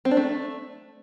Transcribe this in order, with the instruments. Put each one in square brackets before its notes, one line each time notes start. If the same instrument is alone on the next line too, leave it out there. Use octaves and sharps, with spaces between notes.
[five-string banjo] C4
D4
A3